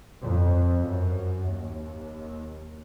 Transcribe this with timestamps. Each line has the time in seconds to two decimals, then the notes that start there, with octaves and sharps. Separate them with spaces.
0.24 F2
0.87 F#2
1.49 D#2